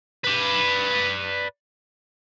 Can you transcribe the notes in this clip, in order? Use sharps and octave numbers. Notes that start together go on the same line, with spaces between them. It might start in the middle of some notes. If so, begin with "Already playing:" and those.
B4 D5